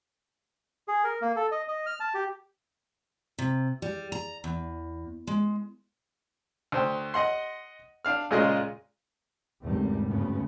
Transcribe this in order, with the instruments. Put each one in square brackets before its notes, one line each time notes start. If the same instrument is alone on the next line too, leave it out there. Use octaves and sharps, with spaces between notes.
[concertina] G#4
A#4
A#3
A4
D#5
D#5
F6
A5
G4
[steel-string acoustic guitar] C3
G3
A#5
E2
G#3
[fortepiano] D2 C5 G5
D#5 F#5 C6
D4 F5 F6
A#2 C#3 G#3 F4 D#5
[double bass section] G#1 E2 C#3 G3 A3
D2 G2 C#3 B3